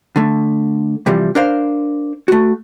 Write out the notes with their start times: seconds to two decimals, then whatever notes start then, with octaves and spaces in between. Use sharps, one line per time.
0.16 D3 A3
1.06 C3 E3 F3 G3
1.35 D4 A#4 C5 F5
2.28 A3 F#4